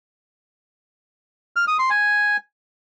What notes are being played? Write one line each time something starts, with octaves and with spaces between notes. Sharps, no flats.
F6
D#6
C6
G#5